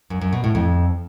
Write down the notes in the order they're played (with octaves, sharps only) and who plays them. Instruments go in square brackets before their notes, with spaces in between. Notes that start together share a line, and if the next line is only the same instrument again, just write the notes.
[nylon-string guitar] F#2
F#2
B2
A2
F2